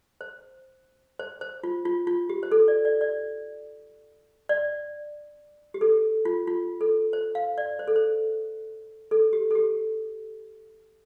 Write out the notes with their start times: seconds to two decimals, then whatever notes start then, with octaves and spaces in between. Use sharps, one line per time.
0.21 C5
1.19 C5
1.41 C5
1.64 F4
1.85 F4
2.07 F4
2.29 G4
2.43 C5
2.52 A4
2.68 D5
2.85 D5
3.01 D5
4.49 D5
5.74 G4
5.81 A4
6.25 F4
6.47 F4
6.81 A4
7.13 C5
7.35 F5
7.58 D5
7.79 C5
7.88 A4
7.96 C5
9.11 A4
9.33 G4
9.51 A4
9.55 G4